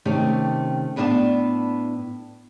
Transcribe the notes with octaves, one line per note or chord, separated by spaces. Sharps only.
C3 D#3 A3 C#4 G4
A2 B3 D4 D#5 F5 A5